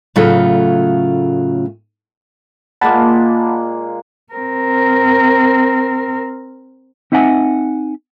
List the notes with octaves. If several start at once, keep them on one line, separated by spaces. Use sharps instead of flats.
A2 C#3 F#3 A3 F4
A#2 G#3 A#3 F#5 A5 B5
C4 A#4
C4 D#4 E5 F#5 G#5